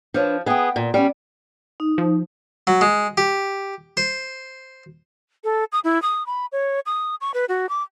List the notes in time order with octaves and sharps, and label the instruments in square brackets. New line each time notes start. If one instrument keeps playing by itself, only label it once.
[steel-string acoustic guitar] F3 [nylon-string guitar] D4 B4 C#5
[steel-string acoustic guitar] B3 G#4 [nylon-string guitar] E5 G5
[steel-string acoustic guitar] A#2
[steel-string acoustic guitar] G3 [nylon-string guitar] B3 C#4
[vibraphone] D#4
[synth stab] F3
[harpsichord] F#3
G#3
G4
C5
[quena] A4
D#6
E4
D#6
B5
C#5
D#6
C#6
B4
F#4
D6